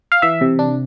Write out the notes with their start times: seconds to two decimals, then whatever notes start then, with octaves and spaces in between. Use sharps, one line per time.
0.12 F5
0.22 E3 E5
0.41 C3
0.59 D4